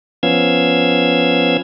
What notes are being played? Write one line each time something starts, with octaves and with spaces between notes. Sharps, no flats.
F3 B3 C#4 F5 E6 G#6